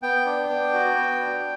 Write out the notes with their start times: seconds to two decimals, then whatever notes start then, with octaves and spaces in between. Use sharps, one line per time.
0.02 B3 G5
0.26 D4
0.49 B3
0.74 F#4
0.97 B3
1.21 D4